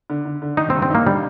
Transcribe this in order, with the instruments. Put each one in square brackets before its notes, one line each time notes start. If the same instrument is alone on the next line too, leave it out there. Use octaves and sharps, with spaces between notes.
[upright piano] D3
D3
D3
[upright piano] D#3 [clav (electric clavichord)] D#4
[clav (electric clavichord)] C4
[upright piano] G2
[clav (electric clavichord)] C4
[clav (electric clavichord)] A#3 [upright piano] D#4
[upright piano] D3 [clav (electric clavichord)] G3